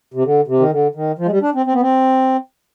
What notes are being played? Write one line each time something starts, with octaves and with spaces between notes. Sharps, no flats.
C3
D3
C3
D#3
D3
D#3
F3
G#3
G3
D4
C4
C4
B3
C4